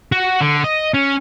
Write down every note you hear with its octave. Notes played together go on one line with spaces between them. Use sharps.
F#4
D3
D#5
C#4